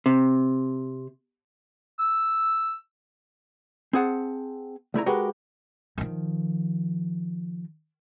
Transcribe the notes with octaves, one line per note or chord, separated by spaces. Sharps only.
C3
E6
C4 G#4 F#5 A5
C2 A3 E4 A#5
G#3 F#4 G4 A#4 B4
D#3 F3